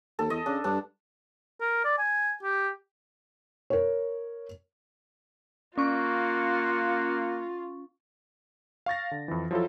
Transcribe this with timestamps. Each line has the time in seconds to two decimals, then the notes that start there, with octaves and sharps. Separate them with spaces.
0.19 D#2 A4
0.30 E2 D#5
0.46 C#3 D4
0.64 G2 D4
1.61 A#4
1.85 D5
1.98 G#5
2.43 G4
3.70 A#4 C#5
5.78 A#3 C#4 F4 F#4 C#6
8.86 F5 C#6 A6 A#6
9.11 D3
9.28 F2 E3
9.51 F3 F#3 E4 F4 A4